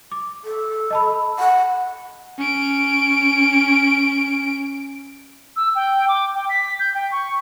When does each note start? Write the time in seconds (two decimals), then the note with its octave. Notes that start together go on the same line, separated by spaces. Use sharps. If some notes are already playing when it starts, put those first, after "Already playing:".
0.12 D6
0.44 A4
0.90 D#5 A5 B5
1.39 F#5
2.38 C#4 D7
5.56 E6
5.75 G5
6.08 D6
6.35 G5
6.49 B6
6.80 G6
6.94 G5
7.12 C#6